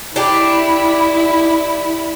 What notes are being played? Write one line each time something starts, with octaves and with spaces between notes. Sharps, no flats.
D4 E4 G4